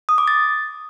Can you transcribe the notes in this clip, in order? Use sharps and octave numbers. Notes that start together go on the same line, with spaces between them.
D#6
D6
A6